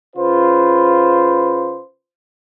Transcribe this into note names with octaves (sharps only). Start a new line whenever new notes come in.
C#3 F4 B4 C5